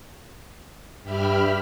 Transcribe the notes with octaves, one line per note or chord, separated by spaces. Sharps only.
G2 G4 E5 B5 F6